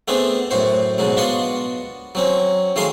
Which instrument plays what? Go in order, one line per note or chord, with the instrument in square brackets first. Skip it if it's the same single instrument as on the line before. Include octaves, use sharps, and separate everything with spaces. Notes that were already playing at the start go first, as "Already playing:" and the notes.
[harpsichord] A3 B3 C4 D4 G#4
F#2 A2 F#4 C5
G#2 B2 F#3 G#3
B3 D4 F4 F#4 D#5 F#5
F#3 C4 C#4
D#3 F#3 A3 G#4 F5 C6